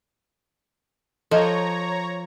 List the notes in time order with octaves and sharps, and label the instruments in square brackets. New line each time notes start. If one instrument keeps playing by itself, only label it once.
[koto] F3 [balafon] A4 D#5 [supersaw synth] C#5 A#5